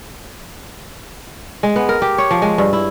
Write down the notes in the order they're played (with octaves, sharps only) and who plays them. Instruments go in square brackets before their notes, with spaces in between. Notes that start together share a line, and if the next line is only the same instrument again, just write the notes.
[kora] G#3
B3
A#4
G4
C#5
F3
G#3
G2
E4